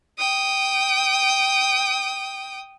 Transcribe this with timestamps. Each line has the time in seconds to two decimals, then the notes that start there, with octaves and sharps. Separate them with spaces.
0.18 G5 D#6